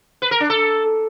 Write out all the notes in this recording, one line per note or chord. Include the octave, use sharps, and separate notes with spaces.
B4
A#4
D4
A4